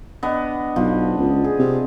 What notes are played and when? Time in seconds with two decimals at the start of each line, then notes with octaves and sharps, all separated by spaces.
0.23 B3 D4 D#5
0.76 B1 F3
1.17 C#2
1.44 G#4
1.59 C3